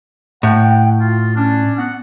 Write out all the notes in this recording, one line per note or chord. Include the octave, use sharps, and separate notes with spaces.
A2 F#5 G5
F4
C#4 D4
B3 F#5